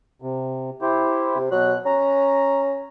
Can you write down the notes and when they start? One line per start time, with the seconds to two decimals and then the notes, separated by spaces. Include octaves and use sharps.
0.22 C3
0.82 E4 G4 C5
1.36 C3
1.52 B2 F#3 F#6
1.86 C#4 A#5